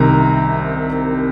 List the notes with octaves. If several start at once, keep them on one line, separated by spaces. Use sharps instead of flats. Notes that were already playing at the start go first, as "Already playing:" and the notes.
Already playing: C2 C3 D#3 A#5